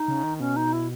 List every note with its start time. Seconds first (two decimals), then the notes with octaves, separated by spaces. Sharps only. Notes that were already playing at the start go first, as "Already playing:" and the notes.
Already playing: D#4
0.08 C#3
0.23 D#3
0.40 B2 C#4
0.56 D#4
0.73 E4